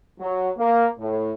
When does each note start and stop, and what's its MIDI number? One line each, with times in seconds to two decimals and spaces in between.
0.19 0.49 54
0.58 0.87 58
0.98 1.30 45